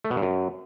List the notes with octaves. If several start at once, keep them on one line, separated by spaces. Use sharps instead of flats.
A3
B2
G2
F#2